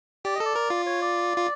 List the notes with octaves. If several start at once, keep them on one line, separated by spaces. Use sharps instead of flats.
G4 D5
D#5
A4 D5
A#4
F4
C#5
D5
F4